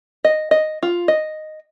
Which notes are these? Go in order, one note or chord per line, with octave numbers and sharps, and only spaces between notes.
D#5
D#5
F4
D#5